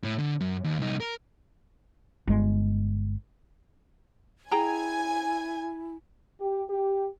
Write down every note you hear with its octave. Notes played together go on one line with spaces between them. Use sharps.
A2
D3
F#2
D#2
C2 D#4
A#4
G1 G#3
E4 G#4 G5 G#5 A#5
G4
G4